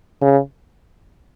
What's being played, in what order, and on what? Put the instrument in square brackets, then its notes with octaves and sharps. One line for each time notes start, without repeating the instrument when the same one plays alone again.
[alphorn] C#3